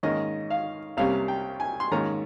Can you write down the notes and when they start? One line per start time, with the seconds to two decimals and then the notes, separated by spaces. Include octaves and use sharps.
0.03 G#2 D#3 A#3 C#4 D#5
0.50 F5
0.97 C2 C3 G3 A#3 C#4 F5
1.28 G5
1.60 G#5
1.80 C6
1.91 G#2 D#3 A#3 C#4 A#5